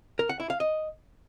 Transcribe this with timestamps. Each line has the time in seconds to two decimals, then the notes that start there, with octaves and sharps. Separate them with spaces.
0.19 A#4
0.29 F#5
0.40 E4
0.50 F5
0.60 D#5